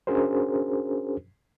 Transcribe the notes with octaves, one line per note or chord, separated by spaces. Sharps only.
C#4 D4 F#4 G#4 A#4 C5